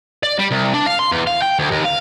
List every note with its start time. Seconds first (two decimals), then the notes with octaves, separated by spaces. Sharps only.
0.23 D5
0.39 G3
0.51 C2
0.74 D4
0.87 F5
0.99 C6
1.12 E2
1.27 F5
1.42 G5
1.59 D2
1.71 D#2
1.84 F5